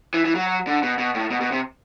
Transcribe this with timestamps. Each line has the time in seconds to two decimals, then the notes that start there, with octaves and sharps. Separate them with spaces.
0.14 E3
0.25 E3
0.35 F#3
0.67 D3
0.83 B2
0.98 B2
1.15 A2
1.31 B2
1.41 B2
1.52 C3